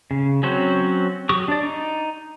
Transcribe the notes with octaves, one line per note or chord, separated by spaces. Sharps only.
C#3
F#3 C4 C#4 F#4 C5
F#3 G4 C#6 D#6
D4 D5
D#4